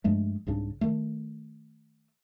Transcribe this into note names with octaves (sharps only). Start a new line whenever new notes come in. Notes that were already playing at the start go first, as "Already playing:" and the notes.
G2 F3 G#3 A3
C2 G#2 C#3 D4
D#3 A3